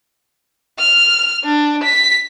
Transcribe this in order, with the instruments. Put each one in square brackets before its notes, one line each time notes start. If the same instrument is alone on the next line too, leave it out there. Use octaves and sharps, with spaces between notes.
[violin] F6
D4
B6